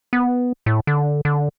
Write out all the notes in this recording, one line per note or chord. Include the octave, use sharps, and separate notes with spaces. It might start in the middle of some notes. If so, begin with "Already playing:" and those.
B3
A2
D3
D3